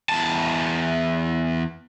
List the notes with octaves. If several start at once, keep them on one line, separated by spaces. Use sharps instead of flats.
E2 A5